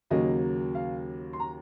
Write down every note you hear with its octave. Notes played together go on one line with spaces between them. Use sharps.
D#2 C#3 F#3 A#3 D#5
F5
C6
A#5